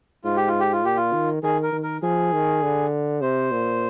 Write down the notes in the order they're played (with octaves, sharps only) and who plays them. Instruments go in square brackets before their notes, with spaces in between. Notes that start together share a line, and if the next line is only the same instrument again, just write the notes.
[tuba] G#2 [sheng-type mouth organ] F4
[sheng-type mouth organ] G4
F4
G4
F4
[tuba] A#2 [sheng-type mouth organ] G4
[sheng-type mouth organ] F4
[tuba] D#3
[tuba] D#3 [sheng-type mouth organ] G#4
[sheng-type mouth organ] A#4
[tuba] D#3
[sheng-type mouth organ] A#4
[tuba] F3 [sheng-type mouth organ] G#4
[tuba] D#3
D3
[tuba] C3 [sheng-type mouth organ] C5
[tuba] A#2